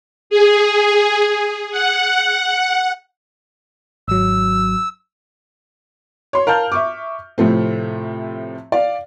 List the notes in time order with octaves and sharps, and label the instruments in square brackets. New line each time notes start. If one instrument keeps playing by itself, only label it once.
[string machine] G#4
F#5
[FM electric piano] G#1 F#3 [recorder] E6
[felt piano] C#5 C6
A#4 F5 A5 F6 G6
E5 C#6 D6
A2 C3 F3 A3 C4
D5 F5